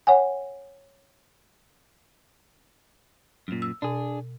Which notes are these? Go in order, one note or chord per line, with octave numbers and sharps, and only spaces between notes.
C#5 F#5 G#5
F#2 A#2
E6
B2 D4 G#4